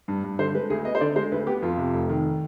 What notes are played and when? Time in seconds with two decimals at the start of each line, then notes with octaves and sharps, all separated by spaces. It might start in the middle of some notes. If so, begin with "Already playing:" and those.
0.08 G2
0.24 G2
0.39 D3 C5
0.55 G#3 B4
0.70 D2 G#4
0.85 B3 D#5
0.95 C5
1.01 D3 D5
1.16 G#3 C5
1.32 D2 B4
1.47 B3 G4
1.62 F2 F4
1.78 C3
1.94 F1
2.09 D#3